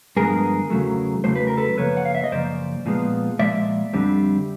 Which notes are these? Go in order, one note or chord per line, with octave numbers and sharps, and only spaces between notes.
G2 D3 F3 G#3 B3 G#4 A#4
E2 C#3 F#3 A3
E2 C#3 F#3 A3 C5
B4
A#4
A4 B4
F#2 C#3 F3 A#3 B4 C#5
F#5
F5
E5
D#5
F#2 C#3 F3 A#3 C5 D5
A#2 F3 G#3 B3
A#2 F3 G#3 D5 E5
F2 D3 G3 C4